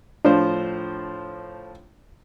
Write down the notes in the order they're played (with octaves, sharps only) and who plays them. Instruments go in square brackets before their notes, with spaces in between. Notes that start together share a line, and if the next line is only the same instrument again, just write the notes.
[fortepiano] A2 F3 C5 [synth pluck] D4